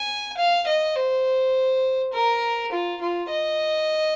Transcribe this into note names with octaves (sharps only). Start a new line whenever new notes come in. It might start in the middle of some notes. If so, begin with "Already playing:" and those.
Already playing: G#5
F5
D#5
C5
A#4
F4
F4
D#5